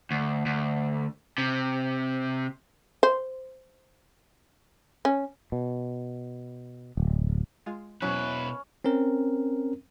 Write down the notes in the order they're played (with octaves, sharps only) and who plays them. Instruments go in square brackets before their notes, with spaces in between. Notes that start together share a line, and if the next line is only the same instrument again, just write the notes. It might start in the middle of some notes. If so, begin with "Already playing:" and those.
[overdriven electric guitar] D2
D2
C3
[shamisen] C5
C#4
[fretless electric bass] B2
D1
[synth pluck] G#3 F4
[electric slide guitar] B2 E4 [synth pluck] F#3 [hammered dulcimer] C#4 [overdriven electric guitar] B4
[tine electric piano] C4 C#4 A#4